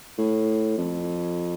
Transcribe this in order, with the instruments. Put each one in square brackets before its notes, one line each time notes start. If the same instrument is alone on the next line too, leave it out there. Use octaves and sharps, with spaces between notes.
[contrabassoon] A2
F2